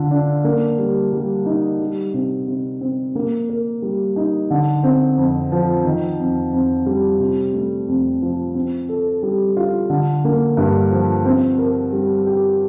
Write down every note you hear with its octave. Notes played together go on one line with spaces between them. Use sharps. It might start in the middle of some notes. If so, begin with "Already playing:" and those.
Already playing: D3 F4
D4
A#3
G3
G3
D#4
G3
C3
C3
C4
A#3
A#4
G3
D#4
D3
C4
F2
F3
D#3
F2
F2
G3
C3
A3
F2
F3
C4
A4
G3
F4
D3
A#3
G2
F3
C4
A#4
G3
G4